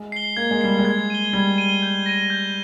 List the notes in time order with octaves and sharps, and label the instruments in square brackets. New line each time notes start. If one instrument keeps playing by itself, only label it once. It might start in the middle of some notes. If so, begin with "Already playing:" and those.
Already playing: [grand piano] G#3
[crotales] C7 G7
[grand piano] A#3 [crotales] G#6
[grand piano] G#3
[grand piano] G3 [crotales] C7 G7
[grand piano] G#3
[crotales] G#6
D#7 G7
[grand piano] G3 [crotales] G#6
[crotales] D#7 G7
G6
A#6 D#7
G6